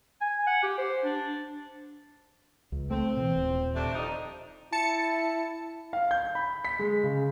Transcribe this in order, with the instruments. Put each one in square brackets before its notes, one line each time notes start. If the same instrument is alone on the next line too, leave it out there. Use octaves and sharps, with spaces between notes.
[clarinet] G#5
F#5
G4
C5
D4
[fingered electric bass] C#2
[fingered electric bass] A3 [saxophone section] C4
[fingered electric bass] B2 E3
D#1
[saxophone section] C3 A3 D4
F2 D#4
[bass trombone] E4 [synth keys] A5 C#7
[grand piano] F5
G6
B5
B6
G#3
C#3